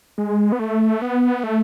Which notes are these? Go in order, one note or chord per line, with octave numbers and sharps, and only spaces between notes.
G#3
B3
A3
B3
A3